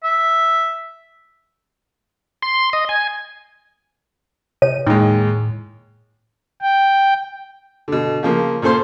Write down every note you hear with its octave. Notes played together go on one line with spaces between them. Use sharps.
E5
C6
D#5
G#5
C3 C#5 D#7
D#2 A2 G#3 D#4
G5
B2 D3
C#3 F3 A#3
A#2 C#4 A4 C5 C6